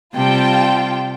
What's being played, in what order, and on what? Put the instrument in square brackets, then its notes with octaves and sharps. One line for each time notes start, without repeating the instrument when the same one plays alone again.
[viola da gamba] C3 G3 [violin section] F4 G5 A5